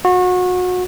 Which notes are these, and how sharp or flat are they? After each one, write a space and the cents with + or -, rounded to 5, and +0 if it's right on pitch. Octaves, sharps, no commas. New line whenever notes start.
F#4 -30